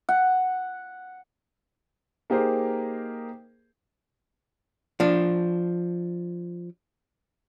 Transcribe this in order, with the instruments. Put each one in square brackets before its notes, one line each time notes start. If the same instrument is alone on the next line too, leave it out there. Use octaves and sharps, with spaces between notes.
[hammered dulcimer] F#5
[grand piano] A#3 D#4 G4 G#4 A#4 C5
[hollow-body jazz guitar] F3 D4